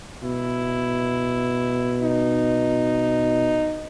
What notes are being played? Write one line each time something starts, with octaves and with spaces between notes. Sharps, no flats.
B2 E4
D#4